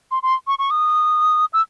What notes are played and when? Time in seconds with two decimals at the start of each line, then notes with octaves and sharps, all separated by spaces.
0.11 C6
0.23 C6
0.47 C#6
0.59 C#6
0.70 D#6
1.53 E6